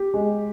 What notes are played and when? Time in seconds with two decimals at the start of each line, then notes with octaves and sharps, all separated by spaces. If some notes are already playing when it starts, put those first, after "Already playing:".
Already playing: G4
0.14 G#3